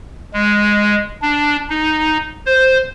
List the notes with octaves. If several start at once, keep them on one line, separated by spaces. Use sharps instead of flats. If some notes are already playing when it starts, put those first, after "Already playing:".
G#3
D4
D#4
C5